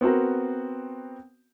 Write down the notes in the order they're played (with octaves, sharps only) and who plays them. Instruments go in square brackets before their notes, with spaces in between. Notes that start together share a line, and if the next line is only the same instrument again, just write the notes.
[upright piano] B3 C4 F#4 A#4